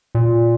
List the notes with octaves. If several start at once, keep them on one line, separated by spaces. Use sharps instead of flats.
A#2